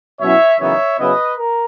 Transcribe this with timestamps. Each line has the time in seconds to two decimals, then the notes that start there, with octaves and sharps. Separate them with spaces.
0.20 B2 F#3 C#4 E4 C#5 E5
0.60 F#2 C#3 E3 B3 D#4 C#5 E5
0.98 C#3 F#3 B3 E4 B4 D#5
1.37 A#4